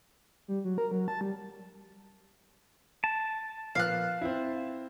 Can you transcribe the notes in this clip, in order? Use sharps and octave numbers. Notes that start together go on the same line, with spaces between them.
G3
F#3
A#4
F#3
A5
G3
A5
A#2 F3 B3 F5 F#6
C4 E4